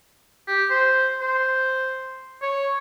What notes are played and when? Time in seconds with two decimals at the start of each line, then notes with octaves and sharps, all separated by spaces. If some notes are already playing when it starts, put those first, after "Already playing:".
0.47 G4
0.70 C5
1.21 C5
2.42 C#5